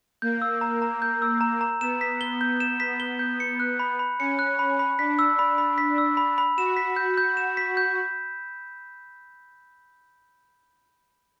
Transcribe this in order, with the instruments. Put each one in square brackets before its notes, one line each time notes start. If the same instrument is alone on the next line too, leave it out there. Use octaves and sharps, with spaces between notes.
[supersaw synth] A#3 [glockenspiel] G6
[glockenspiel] E6
A#5
A#5
G6
E6
A#5
A#5
[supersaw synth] B3 [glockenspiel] E7
[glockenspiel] B6
G7
G6
E7
B6
G7
G6
C#7
F#6
B5
B5
[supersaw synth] C#4 [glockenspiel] C#7
[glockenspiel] F#6
B5
B5
[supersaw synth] D4 [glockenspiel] B6
[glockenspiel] E6
B5
B5
B6
E6
B5
B5
[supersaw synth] F#4 [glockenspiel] E7
[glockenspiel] B6
G6
G6
E7
B6
G6